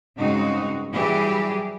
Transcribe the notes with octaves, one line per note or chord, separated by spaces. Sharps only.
G2 C#3 G#3 C4 D#4 F#4
E3 F#3 G3 E4 G4 G#4